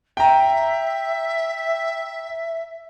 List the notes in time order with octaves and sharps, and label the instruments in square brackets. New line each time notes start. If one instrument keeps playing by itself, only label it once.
[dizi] E5 [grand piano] G5 A#5